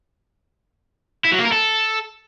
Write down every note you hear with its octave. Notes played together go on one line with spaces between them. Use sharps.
E4
F#3
A#3
A#4
A4